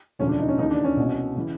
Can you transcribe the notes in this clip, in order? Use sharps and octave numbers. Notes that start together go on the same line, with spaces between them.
E1 D2 C#3 F3 C#4
D4
D#4
C#4
D#2 C#3 E3 D#4
D4
C#4
C2 B2
C#3 E3